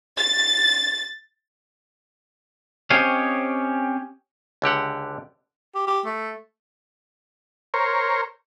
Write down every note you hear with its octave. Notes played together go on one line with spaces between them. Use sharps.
A6
C4 C#4 G4 C#5 D#5 F5
C#2 D3 G4 F#5
G4
G4
A3
A#4 C5 C#5